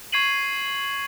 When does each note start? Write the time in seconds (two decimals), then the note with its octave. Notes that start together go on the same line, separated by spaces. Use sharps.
0.12 C#6 G#6 C7 D#7 F#7